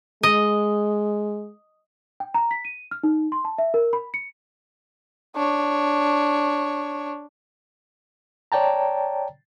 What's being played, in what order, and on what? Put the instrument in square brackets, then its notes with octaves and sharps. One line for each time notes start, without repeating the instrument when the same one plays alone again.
[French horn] G#3 [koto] D#5
[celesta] G5
A#5
B6
D#7
F6
D#4
C6
A5
E5
A#4
B5
C#7
[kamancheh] D4 C#5
[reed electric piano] C#5 D5 G5 A5 A#5